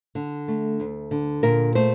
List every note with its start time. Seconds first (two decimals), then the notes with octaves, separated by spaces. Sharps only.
0.15 D3
0.48 A3
0.80 D2
1.11 D3
1.43 A#2 A#4
1.75 A3 C5